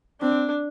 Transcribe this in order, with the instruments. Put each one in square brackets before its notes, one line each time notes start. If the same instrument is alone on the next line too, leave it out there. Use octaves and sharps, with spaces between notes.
[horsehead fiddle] C4 [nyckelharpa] D4